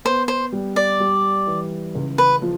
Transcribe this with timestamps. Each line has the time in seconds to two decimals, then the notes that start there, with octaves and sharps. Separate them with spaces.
0.05 B3 C5
0.28 C5
0.52 G3
0.76 D5
1.00 G3
1.47 E3
1.95 C#2
2.18 B4
2.42 F3